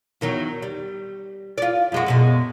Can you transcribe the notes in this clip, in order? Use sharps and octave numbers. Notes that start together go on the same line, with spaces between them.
E2 D#3 F#3
G3
F4 D5
F#2 G#3 F#4
F#2 B2 G#3